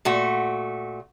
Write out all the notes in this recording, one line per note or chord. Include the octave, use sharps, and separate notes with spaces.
A#2 A3 F#4